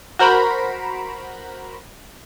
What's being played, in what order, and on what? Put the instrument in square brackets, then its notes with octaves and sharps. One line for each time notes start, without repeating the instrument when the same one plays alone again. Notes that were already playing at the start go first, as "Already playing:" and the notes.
[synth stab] F#4 A#4 C5 A#5 B5